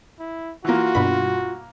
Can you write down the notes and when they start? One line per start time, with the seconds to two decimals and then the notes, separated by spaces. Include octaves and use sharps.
0.19 E4
0.65 E3 A#3 F4 F#4
0.95 G2 B2 B5